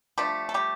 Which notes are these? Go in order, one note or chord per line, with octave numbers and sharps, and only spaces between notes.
F3 G3 A3 D4 G4
A4
G3 G4